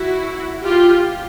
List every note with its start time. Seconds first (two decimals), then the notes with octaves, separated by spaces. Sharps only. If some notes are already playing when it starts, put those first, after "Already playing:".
Already playing: E4 F#4
0.65 F4 G4